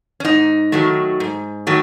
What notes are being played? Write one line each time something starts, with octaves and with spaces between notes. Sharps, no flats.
C#4
G#2 D#4
D#3 F#3 A3
G#2
D#3 F#3 A3